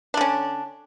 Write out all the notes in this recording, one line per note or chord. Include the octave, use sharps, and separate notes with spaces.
D3 C#4 D4